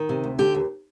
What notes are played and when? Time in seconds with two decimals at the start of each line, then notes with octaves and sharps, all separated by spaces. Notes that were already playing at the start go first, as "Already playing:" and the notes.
Already playing: D#3
0.09 C3
0.24 D2
0.39 D3 G4
0.54 D#2